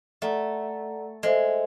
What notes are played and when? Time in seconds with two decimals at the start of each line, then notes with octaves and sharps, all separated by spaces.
0.22 A3 A4 D5 F#5 A#5
1.23 G#3 A4 C5 E5